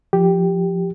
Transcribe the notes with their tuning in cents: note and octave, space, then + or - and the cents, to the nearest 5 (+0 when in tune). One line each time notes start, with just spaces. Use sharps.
F3 +0 G4 +0